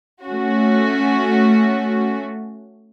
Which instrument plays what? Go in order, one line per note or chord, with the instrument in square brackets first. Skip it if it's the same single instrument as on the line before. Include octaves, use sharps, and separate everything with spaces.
[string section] A3 C#4 F#4